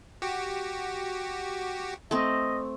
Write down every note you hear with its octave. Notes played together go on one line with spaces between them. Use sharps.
F#4 G4
A3 C4 D#5